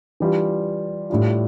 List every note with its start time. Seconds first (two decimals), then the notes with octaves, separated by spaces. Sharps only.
0.20 E3 G3 D4 F4
1.10 A2 G3 D4 F4